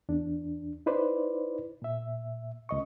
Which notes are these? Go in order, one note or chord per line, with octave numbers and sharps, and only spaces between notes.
E2 D4
D#4 E4 B4 C5 D5
A#2 E5
C#2 D#5 C#6